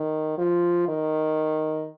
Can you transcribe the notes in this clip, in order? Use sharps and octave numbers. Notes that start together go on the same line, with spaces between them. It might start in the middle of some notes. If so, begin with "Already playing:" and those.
Already playing: D#3
F3
D#3